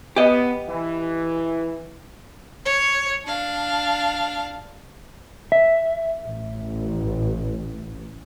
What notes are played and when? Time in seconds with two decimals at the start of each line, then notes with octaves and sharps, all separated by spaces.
0.16 B3 G4 D#5
0.68 E3
2.66 C#5
3.25 D4 F5
5.52 E5
6.26 A1